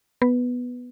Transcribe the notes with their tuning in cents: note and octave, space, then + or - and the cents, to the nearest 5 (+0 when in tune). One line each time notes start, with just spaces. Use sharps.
B3 +0 B4 +0